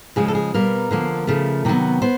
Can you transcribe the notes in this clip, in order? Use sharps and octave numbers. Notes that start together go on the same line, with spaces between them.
C#3 F3 G#3 G#4
A4
G#4
B2 G3 A#3 A#4
D3 F3 A#3
C#3 F3 A3
C3 D#3 F#3 B3
B3 C5